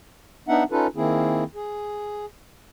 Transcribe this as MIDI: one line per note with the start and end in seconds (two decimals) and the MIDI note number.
0.48 0.64 59
0.48 0.64 62
0.48 0.64 63
0.48 0.64 76
0.48 0.64 78
0.72 0.87 61
0.72 0.87 63
0.72 0.87 65
0.72 0.87 69
0.72 0.87 71
0.96 1.44 51
0.96 1.44 58
0.96 1.44 60
0.96 1.44 64
0.96 1.44 68
1.55 2.26 68